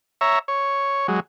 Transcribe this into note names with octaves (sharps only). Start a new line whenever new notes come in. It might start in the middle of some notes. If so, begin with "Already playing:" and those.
C#5 E5 A#5
C#5
F#3 G#3